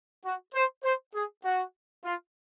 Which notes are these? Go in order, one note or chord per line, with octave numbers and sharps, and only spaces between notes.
F#4
C5
C5
G#4
F#4
F4